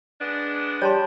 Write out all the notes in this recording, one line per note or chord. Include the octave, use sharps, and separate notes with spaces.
G#3 B3 D4
G3 C#5 A5 C6